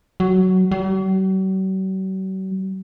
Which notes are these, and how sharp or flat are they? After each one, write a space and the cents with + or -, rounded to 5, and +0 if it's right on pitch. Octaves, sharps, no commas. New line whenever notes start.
F#3 +10
F#3 +45